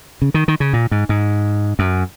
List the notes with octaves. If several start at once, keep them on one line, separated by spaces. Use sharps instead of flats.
C#3
D#3
D#3
C#3
A#2
G#2
G#2
F#2